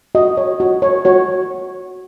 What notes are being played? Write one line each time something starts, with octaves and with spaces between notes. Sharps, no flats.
F#4 D#5
C#5
F#4
C#5
F#4 C#5